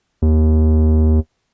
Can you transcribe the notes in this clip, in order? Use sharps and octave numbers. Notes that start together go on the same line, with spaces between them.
D#2